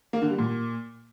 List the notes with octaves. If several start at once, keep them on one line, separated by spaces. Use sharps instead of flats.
A#3
D3
G3
A#2